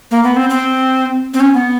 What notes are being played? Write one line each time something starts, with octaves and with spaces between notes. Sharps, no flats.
A#3
B3
C4
C4
C4
C#4
B3